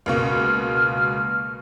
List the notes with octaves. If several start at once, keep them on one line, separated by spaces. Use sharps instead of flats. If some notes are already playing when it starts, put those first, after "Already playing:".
C#2 B2 A#3 F6